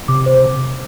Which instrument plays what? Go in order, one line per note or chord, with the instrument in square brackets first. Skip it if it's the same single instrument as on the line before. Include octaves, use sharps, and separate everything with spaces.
[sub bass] C3 [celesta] D6
[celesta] C5